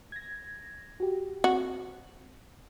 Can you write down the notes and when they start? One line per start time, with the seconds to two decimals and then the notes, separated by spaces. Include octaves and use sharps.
0.12 G#6 A#6
1.00 F#4 G4
1.44 C4 F#4